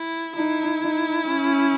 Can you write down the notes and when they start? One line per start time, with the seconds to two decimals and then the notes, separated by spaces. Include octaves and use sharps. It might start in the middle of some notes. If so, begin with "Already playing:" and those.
Already playing: E4
0.35 D#4 E4
0.81 D#4
1.27 C#4